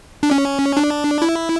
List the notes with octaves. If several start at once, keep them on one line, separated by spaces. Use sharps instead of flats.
D4
C#4
D4
E4